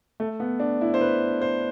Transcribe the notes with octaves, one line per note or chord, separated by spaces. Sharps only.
A3
B3
D4
E4
C5
B4
C5